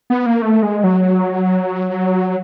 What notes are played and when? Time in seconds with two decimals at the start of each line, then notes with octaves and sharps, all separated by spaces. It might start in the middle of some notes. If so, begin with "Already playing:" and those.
0.10 B3
0.26 A#3
0.42 A3
0.63 G#3
0.84 F#3